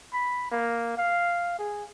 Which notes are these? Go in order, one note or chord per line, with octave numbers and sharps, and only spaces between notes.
B5
A#3
F5
G#4